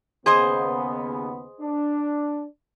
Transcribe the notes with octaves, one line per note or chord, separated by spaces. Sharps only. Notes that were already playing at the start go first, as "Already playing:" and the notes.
D#2 C#3 B3 G#4 C5 D#5
D4